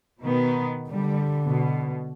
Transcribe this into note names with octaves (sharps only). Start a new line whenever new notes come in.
B2 D#3 B3
D3 G3
B2